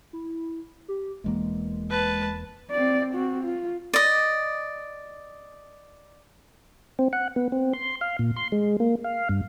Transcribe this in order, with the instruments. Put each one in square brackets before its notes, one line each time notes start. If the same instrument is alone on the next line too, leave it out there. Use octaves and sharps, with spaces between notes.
[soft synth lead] E4
G4
[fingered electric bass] E1 E2 A#3 [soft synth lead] G#3
[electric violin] B4 A5
[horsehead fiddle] C4 D5
C4 F#4
F4
[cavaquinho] D5 D#5
[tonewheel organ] C4
F#5
B3
C4
C6
F5
A#2
C6
G#3
A#3
F5
G2